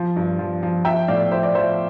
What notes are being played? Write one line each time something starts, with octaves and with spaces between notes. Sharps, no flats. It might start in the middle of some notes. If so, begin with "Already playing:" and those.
Already playing: F3
G2
F3
F3
F3 E5 G5
A2 D5 F5
F3 C5 E5
D5
F3 C5 E5